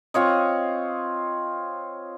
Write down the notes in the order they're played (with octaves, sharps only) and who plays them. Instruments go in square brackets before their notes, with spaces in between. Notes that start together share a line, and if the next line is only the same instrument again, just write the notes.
[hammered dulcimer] C4 F4 C#5 D#5